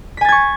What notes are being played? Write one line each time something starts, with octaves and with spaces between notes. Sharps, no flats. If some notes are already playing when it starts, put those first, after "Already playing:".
G#5 C#6 G#6 A6 B6